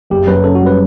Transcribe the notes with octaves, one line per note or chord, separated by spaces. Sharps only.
F#1 G4
F#2 B4
C#3 A4
F#4
G3
B4